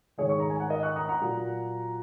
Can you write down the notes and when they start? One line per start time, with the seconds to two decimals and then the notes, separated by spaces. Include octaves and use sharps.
0.18 G#2 D#3 G#3 G#4 C#5
0.29 C#6
0.40 A#5
0.50 G#5
0.60 F#5
0.70 A#4 D#5
0.83 C#6 F#6
0.96 A#5 D#6
1.09 F#5 A#5
1.21 A#2 F#3 A#3